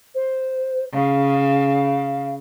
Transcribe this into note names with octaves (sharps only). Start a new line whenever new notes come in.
C5
C#3 F5